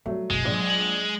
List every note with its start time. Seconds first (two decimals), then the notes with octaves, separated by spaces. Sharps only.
0.06 F#3 G3 A3
0.30 F#1 B1 G#3
0.45 A#1 F#3
0.70 F#7